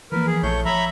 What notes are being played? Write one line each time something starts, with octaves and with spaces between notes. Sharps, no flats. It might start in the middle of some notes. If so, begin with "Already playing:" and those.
E3 F3 A#3 A#4 B4
G#4
A#1 A3 E4 C#5 G6
F3 C#5 E5 A#5 B5